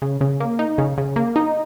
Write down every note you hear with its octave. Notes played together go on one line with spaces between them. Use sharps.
C#3
C#3
A#3
D#4
C#3
C#3
A#3
D#4